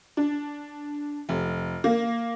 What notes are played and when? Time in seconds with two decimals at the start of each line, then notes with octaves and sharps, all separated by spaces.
0.17 D4
1.29 F1
1.84 A#3